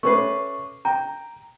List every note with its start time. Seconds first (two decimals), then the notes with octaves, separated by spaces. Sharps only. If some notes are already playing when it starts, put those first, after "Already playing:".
0.03 A3 C#4 B4 C#6 D6 C7
0.85 G5 A#5